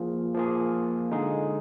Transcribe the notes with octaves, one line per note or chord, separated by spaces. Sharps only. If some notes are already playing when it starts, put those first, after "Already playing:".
Already playing: F3 A#3 F4 G#4
F3 A#3 F4 G#4
D3 G#3 D#4 G#4